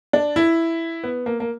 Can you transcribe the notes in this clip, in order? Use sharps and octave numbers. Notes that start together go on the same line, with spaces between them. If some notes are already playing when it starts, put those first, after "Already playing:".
D4
E4
B3
A#3
A#3